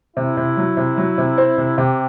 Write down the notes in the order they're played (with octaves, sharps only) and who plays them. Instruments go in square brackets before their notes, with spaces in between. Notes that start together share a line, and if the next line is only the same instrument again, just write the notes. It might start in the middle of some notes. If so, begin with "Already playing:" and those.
[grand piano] C3 [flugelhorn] E4
[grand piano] C3
F#3
C3
F#3
C3
C4
C3
[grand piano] C3 [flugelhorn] G4